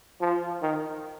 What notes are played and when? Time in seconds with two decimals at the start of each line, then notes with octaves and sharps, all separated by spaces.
0.21 F3
0.62 D#3